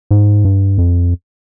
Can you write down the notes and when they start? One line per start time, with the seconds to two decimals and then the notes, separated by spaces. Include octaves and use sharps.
0.11 G#2
0.45 G2
0.78 F2